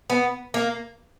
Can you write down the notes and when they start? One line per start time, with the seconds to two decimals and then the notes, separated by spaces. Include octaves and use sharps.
0.10 B3
0.54 A#3